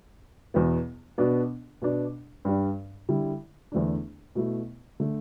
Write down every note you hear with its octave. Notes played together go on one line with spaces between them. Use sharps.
E2 B2 B3
B2 B3 D4
B2 B3 D4
G2 G3 D4
D3 G3 E4
E2 D3 A3 D4
B2 A3 E4
D3 A3